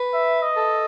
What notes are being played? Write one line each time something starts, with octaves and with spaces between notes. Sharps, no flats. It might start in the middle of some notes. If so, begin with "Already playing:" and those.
Already playing: B4
E5
D#5
A4